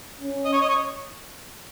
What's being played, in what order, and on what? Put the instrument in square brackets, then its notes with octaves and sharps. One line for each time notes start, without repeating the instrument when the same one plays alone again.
[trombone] C#4
[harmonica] D#5
C#5
D#5
C#5